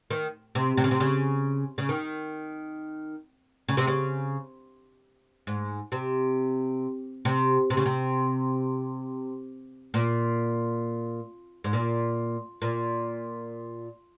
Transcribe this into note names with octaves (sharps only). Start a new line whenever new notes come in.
D#3
C3
C3
C#3
C3
C#3
C#3
D#3
C#3
C3
C#3
G#2
C3
C3
C3
C#3
C3
A#2
G#2
A#2
A#2